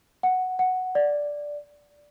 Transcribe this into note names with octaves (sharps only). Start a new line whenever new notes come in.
F#5
F#5
D5